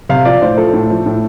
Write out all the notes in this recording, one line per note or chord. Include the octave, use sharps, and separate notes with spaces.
C3 F5
F3 D5
A2 C5
F3 A4
A2
F3
A2